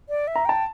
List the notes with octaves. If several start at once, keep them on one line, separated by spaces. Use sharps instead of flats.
D5
E5
A#5
G5 A5